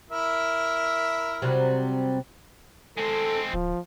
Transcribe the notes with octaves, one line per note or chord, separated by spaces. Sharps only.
E4 A#4 E5
C3 F#3 G3
G#3 C4 A4
D1 F3